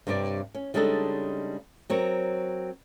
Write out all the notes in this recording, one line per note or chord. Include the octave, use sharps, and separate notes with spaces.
G2 C3 G3 G4 C#5 D5
C#4
C#3 G3 G#3 D4 D#4 A4
F#3 C4 A#4 C#5